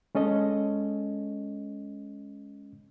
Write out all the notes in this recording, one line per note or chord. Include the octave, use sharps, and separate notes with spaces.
G#3 C#4 A4 D#5